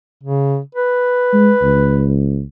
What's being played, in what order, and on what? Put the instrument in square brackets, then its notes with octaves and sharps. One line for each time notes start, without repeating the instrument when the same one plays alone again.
[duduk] C#3
B4
[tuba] G#3
C#2